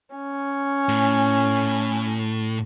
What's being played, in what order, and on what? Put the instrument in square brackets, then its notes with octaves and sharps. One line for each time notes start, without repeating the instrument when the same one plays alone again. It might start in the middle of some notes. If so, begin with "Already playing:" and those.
[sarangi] C#4
[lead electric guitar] A2